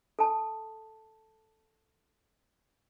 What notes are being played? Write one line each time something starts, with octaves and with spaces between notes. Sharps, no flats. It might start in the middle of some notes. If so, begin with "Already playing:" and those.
A4 A5